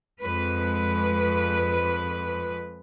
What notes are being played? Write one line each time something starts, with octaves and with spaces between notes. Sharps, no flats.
F2 G#3 B4